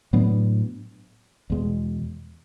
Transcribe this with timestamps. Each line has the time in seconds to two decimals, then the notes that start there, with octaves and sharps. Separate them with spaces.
0.13 A2 F#3 B3 D4
1.50 E2 B2 G#3